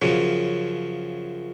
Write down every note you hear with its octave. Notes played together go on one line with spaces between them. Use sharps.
F#2 C#3 F3